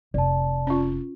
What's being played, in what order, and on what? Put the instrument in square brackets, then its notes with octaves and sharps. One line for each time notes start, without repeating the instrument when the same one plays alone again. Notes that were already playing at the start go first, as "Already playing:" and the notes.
[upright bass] F1 [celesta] D5 A5
[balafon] C#4 F4